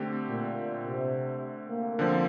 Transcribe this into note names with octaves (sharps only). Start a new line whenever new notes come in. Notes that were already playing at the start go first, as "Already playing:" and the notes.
Already playing: D3 A3 C4 G4
A#2
C3
A#3
D3 F3 C4